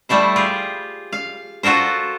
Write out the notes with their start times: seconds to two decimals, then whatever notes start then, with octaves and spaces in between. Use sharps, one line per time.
0.09 G3 A3 E4 C5
0.36 F4 G4 G#4
1.12 F5
1.63 F4 F#4 A4 A#4 C5